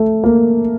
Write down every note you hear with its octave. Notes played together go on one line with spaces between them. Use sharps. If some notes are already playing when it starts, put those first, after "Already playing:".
Already playing: A3
A#3